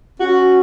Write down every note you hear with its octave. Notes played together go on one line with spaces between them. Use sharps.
C#4 F#4